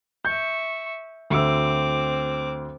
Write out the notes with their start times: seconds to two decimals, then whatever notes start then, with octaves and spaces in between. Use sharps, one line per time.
0.25 E5 C#6 G6
1.30 D2 C4 F#4 D6 E6